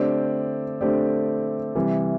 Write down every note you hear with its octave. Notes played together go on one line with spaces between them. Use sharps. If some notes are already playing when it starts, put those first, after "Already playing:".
Already playing: D3 A3 C4 G4 D5
D3 A3 C4 G4 D5
C3 E3 G3